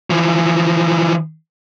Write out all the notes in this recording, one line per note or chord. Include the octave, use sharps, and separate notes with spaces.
E3 F3